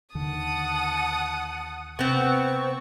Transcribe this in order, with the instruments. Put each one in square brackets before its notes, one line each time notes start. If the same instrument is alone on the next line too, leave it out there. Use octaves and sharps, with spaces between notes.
[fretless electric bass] D#2 D3 D#3 [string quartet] F#5 A5 D#6
[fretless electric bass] C3 [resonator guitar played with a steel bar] B3 C4 [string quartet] C#6